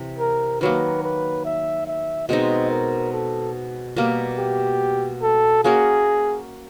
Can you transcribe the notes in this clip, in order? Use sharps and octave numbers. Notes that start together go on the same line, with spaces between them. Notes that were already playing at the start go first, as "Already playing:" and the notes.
Already playing: C3 E3
A#4
D#3 F#3 A#3 B4
B4
E5
E5
B2 G#3 C4 D#4 D#5
A#4
A4
B2 G3 A#3
G4
A4
A#3 C#4 F#4 G#4 A#4